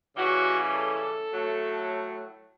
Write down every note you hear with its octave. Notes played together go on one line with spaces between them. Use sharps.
C#3 E3 G3 C#4 F#4
A4
A2 F#3 A3